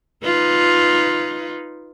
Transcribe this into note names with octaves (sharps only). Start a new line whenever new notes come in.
D#4 F4 B4